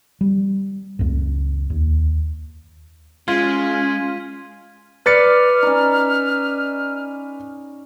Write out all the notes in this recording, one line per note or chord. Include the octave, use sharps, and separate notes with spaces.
G3
C#2 F#2
D#2
G#3 C#4 F4 G#6 B6 D#7
B4 D5 F6 A6 C#7
C#4 D#4